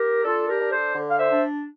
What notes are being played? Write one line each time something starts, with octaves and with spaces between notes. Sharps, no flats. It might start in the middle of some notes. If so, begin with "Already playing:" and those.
Already playing: G4 A#4
D4 F4 A4
G4 A#4
D4
A4 C5
D3
F5
C5 E5
D4